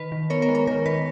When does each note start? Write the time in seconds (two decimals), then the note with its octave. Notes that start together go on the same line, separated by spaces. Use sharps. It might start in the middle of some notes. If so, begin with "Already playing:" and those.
Already playing: D#3 B4
0.12 D#3
0.30 B3 A#4 C#5
0.42 A#4 C#5
0.49 G#3
0.55 A#4 C#5
0.67 D#3 A#4
0.86 D#3 B4